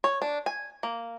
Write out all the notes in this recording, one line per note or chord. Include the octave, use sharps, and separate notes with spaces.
C#5
D4
G#5
A#3